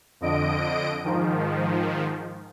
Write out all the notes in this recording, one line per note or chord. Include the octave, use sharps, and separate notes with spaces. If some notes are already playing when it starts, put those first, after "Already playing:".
F2 D3 D#5 D7
G#2 D#3 F3